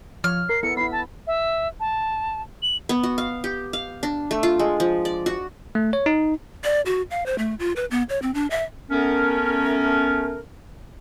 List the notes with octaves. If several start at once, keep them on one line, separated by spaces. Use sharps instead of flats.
F3 C#5 F6
A#4 C7
B3 E4 A4 C#7
B3 E4 B5 C7
A5
E5
A5
F#7
B3
F#4
F5
G4
F5
D4
A3
F4
G#3
F3
D5
F#4
A3
C#5
D#4
D5
F#4
F5
C5
A3
F4
B4
B3
C#5
C4
D4
E5
A3 B3 C#4 A#4